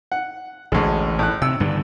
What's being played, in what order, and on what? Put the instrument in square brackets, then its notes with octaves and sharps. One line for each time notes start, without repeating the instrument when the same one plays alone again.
[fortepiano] F#5
[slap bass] A1 [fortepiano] D2 G#3
[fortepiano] A2 F#6
[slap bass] C3 [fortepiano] E6
[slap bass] G2 D3 D#3